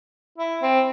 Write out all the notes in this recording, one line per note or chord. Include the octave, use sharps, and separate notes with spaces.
E4
C4